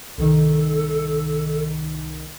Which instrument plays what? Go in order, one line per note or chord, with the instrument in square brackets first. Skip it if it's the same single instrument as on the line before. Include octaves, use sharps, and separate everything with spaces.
[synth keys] C2 D#3 [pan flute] A4